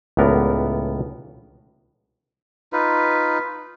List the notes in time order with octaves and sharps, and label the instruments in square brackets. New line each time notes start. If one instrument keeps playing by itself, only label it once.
[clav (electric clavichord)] C#2 A2 B3 A#4 D5
[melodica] D#4 F4 B4